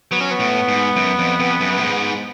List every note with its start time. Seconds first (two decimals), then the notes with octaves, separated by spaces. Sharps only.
0.11 F#3 B3
0.21 C#4
0.31 B3
0.40 A2
0.68 G#2
0.96 F#2
1.19 F2
1.40 F2
1.61 F#2
1.78 A2
1.82 G#2